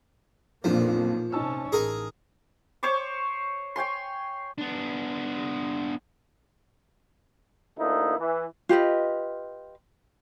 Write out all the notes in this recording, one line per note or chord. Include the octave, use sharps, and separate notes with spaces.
B1 F2 A#2 F3 A#3 D4
C3 C#4 D#4 A5 E6
A1 G#4 A#4 G#5
C5 C#5 C#6 D6
C#5 G5 G#5 C6
B3 D4
D2 A#3 D#4 E4
E3
F4 G4 B4 D#5